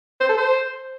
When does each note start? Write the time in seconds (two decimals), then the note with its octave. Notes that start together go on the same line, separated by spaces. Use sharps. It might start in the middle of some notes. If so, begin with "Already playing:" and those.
0.20 C5
0.29 A4
0.38 C5